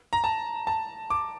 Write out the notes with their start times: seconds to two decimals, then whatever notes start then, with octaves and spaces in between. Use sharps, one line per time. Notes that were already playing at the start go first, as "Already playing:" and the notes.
0.13 A#5
0.24 A5
0.67 A5
1.10 D6